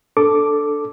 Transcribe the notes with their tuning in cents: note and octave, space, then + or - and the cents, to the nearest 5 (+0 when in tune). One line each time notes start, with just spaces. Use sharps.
D4 +0 A4 +0 D6 +0